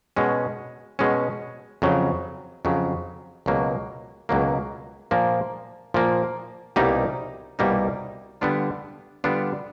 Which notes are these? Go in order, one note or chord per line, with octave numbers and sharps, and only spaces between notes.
B2 G#3 C#4
B2 G#3 C#4
F2 C#3 F#3
F2 C#3 F#3
C#2 B2 F#3 A#3
C#2 B2 F#3 A#3
A#2 F3 A#3
A#2 F3 A#3
C2 B2 G3 A#3 D#4
C2 B2 G3 A#3 D#4
D3 G3 B3 D4 F4
D3 G3 B3 D4 F4